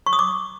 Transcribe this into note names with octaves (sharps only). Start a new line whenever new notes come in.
C#6
D#6
D6